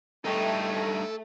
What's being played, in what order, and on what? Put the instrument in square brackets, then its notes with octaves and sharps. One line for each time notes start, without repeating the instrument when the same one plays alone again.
[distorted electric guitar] G2 D#4 [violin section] A3 [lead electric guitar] A4 G5